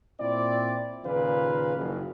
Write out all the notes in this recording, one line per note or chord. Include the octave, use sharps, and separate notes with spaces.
A#2 C4 E4 D5
D#2 A#2 C#3 F3 B4 F5
F#1